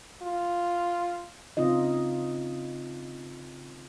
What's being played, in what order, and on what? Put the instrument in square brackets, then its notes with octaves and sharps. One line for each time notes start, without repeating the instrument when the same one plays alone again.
[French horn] F4
[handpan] C#3 C4 D#4 F4 D#5